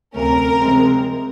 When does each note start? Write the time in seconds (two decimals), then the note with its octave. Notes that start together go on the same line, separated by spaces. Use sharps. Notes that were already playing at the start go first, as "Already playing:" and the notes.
0.14 D2 C3 F3 A3 C#4 A#4
0.60 C3 F3 G#3 C4